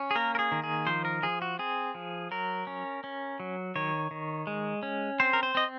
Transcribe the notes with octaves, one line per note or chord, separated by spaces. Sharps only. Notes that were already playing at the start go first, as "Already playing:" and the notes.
Already playing: C#4
G#4
A#3 A#4
A#4
G#4
D#3
G#4
F3 C5
A#4
F3 G#4
F#4
C4 G#4
F3
F#3 A#4
C#4
C#4
F#3
D#3 C#5
D#3
G#3
C#4
C4 C5
A#4
C5
C4 D#5